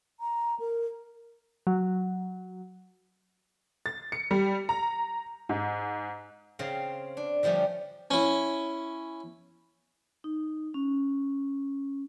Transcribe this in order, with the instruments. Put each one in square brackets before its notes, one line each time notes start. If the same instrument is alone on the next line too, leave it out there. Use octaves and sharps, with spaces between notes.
[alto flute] A#5
A#4
[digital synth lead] F#3
[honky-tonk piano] A6
C#7
G3
A#5
G#2
[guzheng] C#3 C4 F5
D4
D3 F3 G3 A3 C#4
[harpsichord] C#4 E4
[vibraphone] D#4
C#4